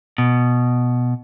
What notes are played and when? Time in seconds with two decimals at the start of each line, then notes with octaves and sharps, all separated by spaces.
0.18 B2